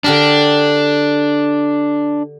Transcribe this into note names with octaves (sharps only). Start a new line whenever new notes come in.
D3 D4 G4 A#4